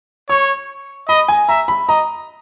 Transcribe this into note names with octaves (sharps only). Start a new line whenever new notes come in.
C#5 C#6
D#5 B5
G#5
E5 A#5
B5
D#5 A#5